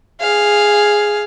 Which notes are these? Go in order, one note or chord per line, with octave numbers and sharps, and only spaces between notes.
G#4 F5